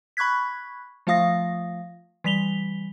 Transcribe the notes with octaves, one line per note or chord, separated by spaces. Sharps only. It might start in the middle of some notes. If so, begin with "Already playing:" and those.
B5 C#6 F#6 G#6 B6
F3 A3 F4 F5 D#6 A#6
E3 G3 B6 F7 G7